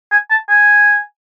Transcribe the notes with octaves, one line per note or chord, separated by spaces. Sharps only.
G#5
A5
G#5